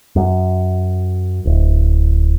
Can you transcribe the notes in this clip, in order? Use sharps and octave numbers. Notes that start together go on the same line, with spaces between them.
F#2
D1